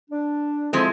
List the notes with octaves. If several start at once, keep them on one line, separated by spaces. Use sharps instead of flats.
D4
F3 G#3 C4 E4 G#4 A4